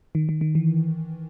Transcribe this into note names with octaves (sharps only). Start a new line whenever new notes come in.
D#3
D#3
D#3
E3